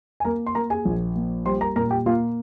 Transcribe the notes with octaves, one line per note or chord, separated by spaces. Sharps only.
G#5
A#3 A#4 A#5
C6
A#3 A#4 A#5
G#4 G#5
A#1
A#3
G3 C5 C6
A#4 A#5
A#2 A#4 A#5
G4 G5
A#3 F4 F5